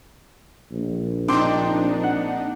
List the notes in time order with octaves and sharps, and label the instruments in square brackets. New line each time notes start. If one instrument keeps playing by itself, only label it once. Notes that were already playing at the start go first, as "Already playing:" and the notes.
[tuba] A#1
[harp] C4 C6 D6 [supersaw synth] D4 D#4
[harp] F#5